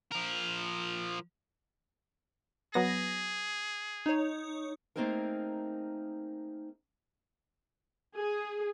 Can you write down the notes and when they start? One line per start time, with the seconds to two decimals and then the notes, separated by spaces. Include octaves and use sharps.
0.12 F3 A#4
2.74 F#3 B3 G#4 A#6
4.06 D#4 C#5
4.96 A3 A#3 C4 D#4 G#4 A#4
8.16 G#4